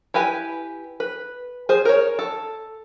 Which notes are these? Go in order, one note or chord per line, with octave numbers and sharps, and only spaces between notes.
E4 G4 B4 G#5
B4
G#4 C5
A#4 C#5
A4